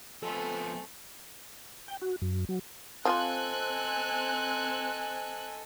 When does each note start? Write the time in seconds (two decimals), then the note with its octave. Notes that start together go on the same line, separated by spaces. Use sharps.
0.22 F3 A3 B3 C4 A4 G#5
1.88 G5
2.02 F#4
2.22 F#2
2.49 F#3
3.05 F3 C4 F4 A4 C5 D#5 G#5 F#6